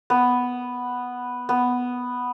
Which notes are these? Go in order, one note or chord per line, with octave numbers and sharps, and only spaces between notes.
B3
B3